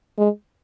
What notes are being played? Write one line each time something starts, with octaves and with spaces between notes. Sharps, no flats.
G#3